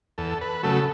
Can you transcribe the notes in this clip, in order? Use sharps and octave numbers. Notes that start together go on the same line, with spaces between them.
E2 A4
B4
C#3 F#3 A3 A4